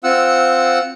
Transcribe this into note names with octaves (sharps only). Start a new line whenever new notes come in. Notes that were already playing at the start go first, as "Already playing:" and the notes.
C4 F4 F#5 E6